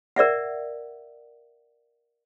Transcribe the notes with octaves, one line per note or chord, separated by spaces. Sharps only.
A#4 D5 E5 F#5